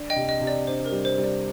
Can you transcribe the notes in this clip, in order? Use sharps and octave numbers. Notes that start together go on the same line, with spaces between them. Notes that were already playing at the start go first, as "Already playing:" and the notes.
Already playing: D4
D#5 G5
C3
D#5
C3
D5
D4 C5
A#4
G3
C5
G3
D5